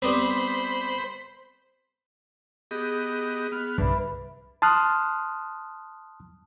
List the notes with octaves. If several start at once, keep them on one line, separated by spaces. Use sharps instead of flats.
G3 B3 C4 C5 B5
B3 G4 G#4 D#5
B3 F6
C2 G2 D3 B4 E5 B5
A5 C6 D#6 F6 F#6